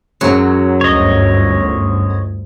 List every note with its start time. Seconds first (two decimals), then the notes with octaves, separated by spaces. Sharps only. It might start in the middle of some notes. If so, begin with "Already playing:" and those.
0.21 F#2 F#3 G#3
0.81 G1 D2 C#5 D#5